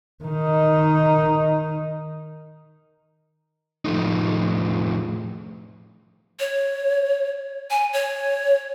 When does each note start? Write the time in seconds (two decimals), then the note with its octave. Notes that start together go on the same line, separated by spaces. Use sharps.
0.24 D#3 D#4
3.85 A2 F3 A3 D#4
6.39 C#5
7.70 G#5
7.93 C#5